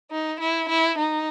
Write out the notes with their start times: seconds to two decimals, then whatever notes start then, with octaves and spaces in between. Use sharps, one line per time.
0.11 D#4
0.40 E4
0.69 E4
0.98 D#4